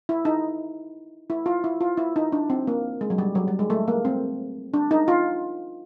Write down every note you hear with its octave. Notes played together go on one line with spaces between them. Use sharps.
E4
D#4
E4
F4
E4
F4
E4
D#4
D4
C4
A#3
G#3
F#3
G3
F#3
G3
G#3
A3
A#3
C4
D4
D#4
F4